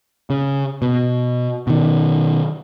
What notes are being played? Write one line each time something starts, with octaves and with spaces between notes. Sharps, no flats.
C#3
B2
B2 D#3